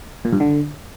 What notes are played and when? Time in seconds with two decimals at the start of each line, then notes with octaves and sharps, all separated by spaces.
0.25 A#2
0.33 G2
0.40 D3